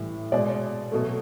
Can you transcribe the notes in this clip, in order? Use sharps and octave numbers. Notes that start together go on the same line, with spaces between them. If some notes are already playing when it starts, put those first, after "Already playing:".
Already playing: A2 E3 G3
B2 G#3 D5
B2 F#3 A3